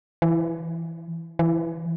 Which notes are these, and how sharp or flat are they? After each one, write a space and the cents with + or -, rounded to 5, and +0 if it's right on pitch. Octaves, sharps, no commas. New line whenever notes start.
E3 +5
E3 +5